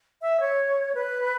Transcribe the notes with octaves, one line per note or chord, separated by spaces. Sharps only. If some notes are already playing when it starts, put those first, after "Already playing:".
E5
C#5
B4